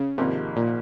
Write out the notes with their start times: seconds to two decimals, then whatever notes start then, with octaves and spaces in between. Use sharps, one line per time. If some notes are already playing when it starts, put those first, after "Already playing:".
Already playing: C#3
0.18 G#1 G#2 C3 F3 A#3 D#4
0.56 A#2